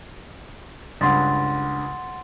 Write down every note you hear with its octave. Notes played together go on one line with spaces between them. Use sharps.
C#2 G2 F#5 C6 A6